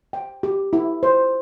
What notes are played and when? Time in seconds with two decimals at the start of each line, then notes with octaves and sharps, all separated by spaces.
0.13 G5
0.43 G4
0.73 E4
1.03 C5